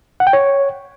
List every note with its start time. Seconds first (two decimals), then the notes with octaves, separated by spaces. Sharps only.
0.20 F#5
0.27 G5
0.33 C#5